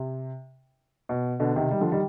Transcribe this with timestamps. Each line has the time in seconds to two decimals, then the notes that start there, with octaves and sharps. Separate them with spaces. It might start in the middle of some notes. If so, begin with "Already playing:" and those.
Already playing: C3
1.09 B2
1.40 B2 D3
1.56 C3 D#3
1.71 D#3 G3
1.81 D3 F3
1.92 D#3 G3